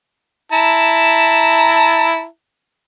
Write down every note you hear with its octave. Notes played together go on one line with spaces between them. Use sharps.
E4 A5 A#5